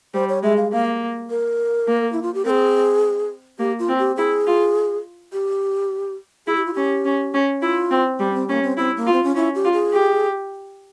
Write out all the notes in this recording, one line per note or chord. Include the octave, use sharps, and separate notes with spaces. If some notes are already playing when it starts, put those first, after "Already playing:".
G3 C5
C#5
G#3 E5
F5
A#3 F5
A#4
A#3
E4
F4
G4
C4 A#4
G#4
A#3 G4
F4
C4
G4
E4 G#4
F4
G4
E4 G#4
G4
F4
C#4 G4
C#4
C#4
E4 F4
C4
G3 C4
C#4
C4
A#3 C#4
C4
C4 E4
A#3
F4
C4
C#4
C#4 E4
G4
F4
G#4
G4